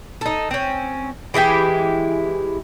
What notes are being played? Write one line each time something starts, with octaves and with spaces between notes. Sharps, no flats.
D#4 A4
C4 C#4
E3 G#3 E4 G4